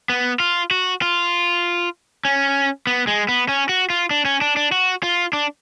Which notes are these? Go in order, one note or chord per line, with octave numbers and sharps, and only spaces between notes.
B3
F4
F#4
F4
C#4
B3
G#3
B3
C#4
F#4
F4
D4
C#4
D4
D4
F#4
F4
D4